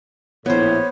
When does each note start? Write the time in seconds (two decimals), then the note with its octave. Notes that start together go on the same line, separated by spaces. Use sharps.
0.46 A#1 A2 B3 E4 C5 C#5